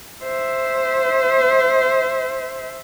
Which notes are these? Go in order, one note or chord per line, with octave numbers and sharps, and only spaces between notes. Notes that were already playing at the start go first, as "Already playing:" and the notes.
C5 E5